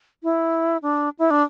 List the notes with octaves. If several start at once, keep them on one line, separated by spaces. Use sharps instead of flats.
E4
D4
E4
D4